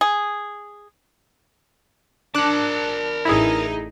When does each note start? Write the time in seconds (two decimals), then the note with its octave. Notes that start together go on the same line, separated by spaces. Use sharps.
0.01 G#4
2.35 D4 A#4 A5 D6 F#6
3.25 A1 D#4 E4 G#4